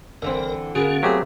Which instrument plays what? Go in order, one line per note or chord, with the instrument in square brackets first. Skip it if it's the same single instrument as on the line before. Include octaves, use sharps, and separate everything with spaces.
[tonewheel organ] F#1 A#4 [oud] D3 E3 C4
[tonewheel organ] D3 C#4 [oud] A#3 B3 F#4 [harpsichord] G#4
[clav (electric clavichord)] F#3 A3 G4 [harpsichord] C4 G#4 C5